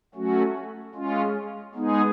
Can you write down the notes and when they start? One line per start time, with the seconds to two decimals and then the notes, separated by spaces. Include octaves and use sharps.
0.15 F#3 A3 C#4 F#4
0.95 G#3 C#4 F4
1.75 G#3 B3 D#4 G#4